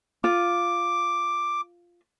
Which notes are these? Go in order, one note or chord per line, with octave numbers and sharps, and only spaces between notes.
F4 D6